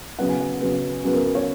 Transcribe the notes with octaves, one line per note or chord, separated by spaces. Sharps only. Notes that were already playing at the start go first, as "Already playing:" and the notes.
C#3 F#3 B3 F#5
G#5
F#5
C#3 F#3 B3
C#3 F#3 B3 G#4
A#4
B4
C#5